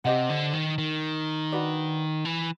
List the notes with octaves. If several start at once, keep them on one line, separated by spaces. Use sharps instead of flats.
C3 G4 C5 D#5 F#5
D3
D#3
D#3
D4 F#4 B4 D5
E3